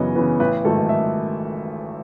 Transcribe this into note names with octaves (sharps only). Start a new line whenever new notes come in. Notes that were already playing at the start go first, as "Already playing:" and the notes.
Already playing: F#2 C#3 E3 B3 C#5 D#5
C#3 E3 B3
A1 B4
G#2 D#3 F#3 A3 A4
E5